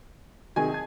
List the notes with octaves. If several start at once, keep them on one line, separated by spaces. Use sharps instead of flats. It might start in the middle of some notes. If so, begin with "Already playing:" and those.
C3 D#3 F#3 G#4 D#5 G#5
A5 G#6